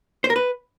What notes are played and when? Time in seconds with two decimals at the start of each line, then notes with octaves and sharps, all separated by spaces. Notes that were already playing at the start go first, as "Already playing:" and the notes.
0.24 C5
0.30 A#4
0.36 B4